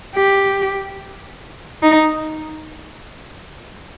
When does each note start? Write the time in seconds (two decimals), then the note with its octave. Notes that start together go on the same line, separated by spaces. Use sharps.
0.16 G4
1.83 D#4